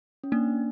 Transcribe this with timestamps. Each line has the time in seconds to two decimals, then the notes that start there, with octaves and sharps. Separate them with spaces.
0.24 C#4
0.32 A#3 D4